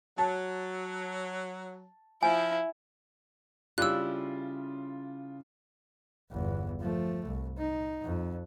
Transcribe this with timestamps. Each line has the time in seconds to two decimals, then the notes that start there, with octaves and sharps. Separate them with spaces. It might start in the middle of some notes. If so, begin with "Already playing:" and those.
0.18 F#3 A5
2.23 F3 E4 G#5
3.78 C#3 G3 C#4 D4 E4 F4 E6 F#6
6.31 G1 E2
6.81 F3 A3
7.26 C2
7.58 D#4
8.04 F2